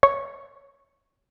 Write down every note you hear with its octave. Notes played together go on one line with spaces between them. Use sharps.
C#5